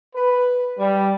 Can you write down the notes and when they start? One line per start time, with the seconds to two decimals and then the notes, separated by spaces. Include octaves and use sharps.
0.15 B4
0.78 G3